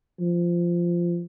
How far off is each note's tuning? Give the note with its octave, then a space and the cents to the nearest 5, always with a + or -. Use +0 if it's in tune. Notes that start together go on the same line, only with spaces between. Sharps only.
F3 -15